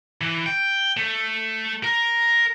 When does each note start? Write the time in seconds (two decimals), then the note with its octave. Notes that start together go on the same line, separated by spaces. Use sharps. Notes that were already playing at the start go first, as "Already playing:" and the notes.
0.21 E3
0.46 G5
0.97 A3
1.83 A#4